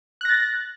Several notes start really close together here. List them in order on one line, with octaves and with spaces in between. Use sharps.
F#6 A#6 A6